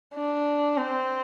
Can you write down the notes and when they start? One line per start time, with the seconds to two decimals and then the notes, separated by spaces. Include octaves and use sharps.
0.14 D4
0.77 C4